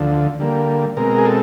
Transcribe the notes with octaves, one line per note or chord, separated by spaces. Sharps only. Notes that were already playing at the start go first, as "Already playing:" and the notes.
Already playing: D2 D3 F3
D3 G3 A#3
B2 G#3 C4 A#4
G#4
A4